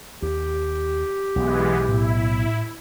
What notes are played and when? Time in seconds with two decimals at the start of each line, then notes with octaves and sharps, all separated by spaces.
0.22 D#2 G4
1.36 B1 E3 G#3 B3
1.89 A2 E4